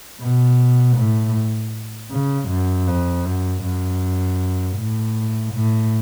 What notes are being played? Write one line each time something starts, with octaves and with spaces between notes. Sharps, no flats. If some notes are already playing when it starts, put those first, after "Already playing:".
B2
A2
C#3
F#2
F2
F#2
F#2
A2
A2